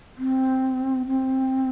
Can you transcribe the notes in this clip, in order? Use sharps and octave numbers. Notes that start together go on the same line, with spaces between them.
C4
C4